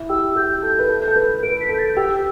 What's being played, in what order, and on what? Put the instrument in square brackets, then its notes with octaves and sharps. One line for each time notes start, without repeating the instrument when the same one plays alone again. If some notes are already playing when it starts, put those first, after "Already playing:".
Already playing: [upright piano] E4
[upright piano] G4 [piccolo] E6
[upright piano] G4 [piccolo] G6
[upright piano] A4 [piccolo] G6
[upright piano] B4
A4
A4
B4
[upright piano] B4 [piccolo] D7
[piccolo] B6
[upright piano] A4 [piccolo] G6
[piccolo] A6
G6
[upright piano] G4 [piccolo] E6